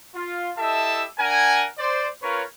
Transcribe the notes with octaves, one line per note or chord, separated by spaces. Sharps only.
F4
E4 G4 A4 D#5 E5 A5
D4 A#4 F#5 G#5
C5 D5
C#4 F4 A#4 B4 C#5